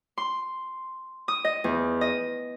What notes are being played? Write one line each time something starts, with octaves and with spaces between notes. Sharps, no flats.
C6
D#6
D#5
E2
D#5